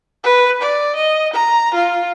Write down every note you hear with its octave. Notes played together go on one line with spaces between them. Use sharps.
B4
D5
D#5
A#5
F4